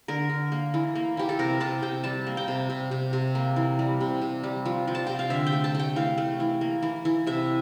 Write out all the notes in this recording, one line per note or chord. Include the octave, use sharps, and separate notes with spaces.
D3 A#4
D3
A#3
E3
A#3
E3 G4
A4
C3 A#4
C3 A5
C3 G5
G3 A5
A#3
G5
C3
C3
C3
C3
A#3
E3
G3
C3
C3
G3
F3
F3
A5
C3 G5
F5
D3 E5
G5
A3
A5
A3 G5
E3 F5
A3
E3
A#3
E3
E3
C3 E5